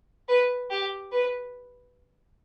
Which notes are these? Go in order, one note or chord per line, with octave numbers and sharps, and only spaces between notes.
B4
G4
B4